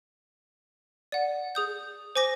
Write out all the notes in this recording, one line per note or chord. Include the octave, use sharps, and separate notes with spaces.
D5 F#5
G#4 D#6 G6
C5 G#5 D6 A#6